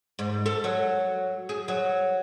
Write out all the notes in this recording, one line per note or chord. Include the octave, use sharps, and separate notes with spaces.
G#2
A4
F#3
G#4
F#3